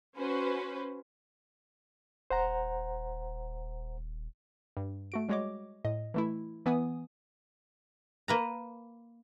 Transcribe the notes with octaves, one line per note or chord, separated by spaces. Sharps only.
C#4 F#4 B4 C5
D#1 C5 F#5 A#5
G2
A3 F#4 D7
G3 G#3 F#4 C#5 D#5 D6
A2 D#5
E3 A3 E4
E3 B3 G#5 D#6
A#3 B4 A#5